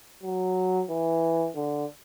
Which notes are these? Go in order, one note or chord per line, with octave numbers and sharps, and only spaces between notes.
F#3
E3
D3